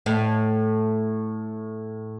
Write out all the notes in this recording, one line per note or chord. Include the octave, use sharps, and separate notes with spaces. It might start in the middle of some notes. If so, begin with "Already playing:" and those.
A2